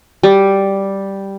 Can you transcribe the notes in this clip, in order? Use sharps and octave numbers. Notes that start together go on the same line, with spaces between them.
G3